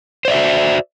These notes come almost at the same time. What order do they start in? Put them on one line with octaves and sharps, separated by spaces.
C5 D5 E5 F#4